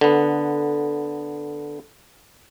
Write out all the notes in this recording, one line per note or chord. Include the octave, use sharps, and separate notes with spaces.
D3 B3